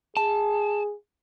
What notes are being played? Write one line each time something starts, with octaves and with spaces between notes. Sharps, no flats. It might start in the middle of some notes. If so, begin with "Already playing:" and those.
G#4 A5